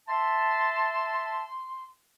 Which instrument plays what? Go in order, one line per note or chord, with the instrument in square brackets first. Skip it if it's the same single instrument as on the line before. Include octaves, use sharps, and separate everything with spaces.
[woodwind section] E5 A5 [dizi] C6